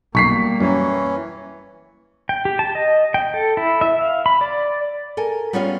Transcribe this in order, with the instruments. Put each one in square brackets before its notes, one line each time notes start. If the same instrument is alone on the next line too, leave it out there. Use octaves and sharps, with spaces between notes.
[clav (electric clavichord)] B1 [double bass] G3 A#3 [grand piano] C#6 B6 C7
[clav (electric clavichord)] F#2 [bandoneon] E3 C#4
[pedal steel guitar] G5
G4
A5
D#5
G5
A4
E4
E5
F5
B5
D5
[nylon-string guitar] A4 A#4 G#5
G3 B3 C#4 F4 C#5 F5